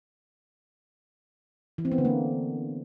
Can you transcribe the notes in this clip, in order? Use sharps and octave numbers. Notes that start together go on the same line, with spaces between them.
E3
C4
B3
D3
A#3